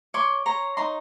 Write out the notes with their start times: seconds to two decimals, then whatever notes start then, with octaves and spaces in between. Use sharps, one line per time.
0.14 C#5 C6 D6
0.46 C#5 A#5 C6
0.77 D#4 A#5 C6